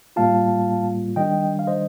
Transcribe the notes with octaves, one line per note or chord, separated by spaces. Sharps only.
A2 G3 A#3 F4 F5 A5
D#3 G3 D4 D#5 G5
F5
C5 D#5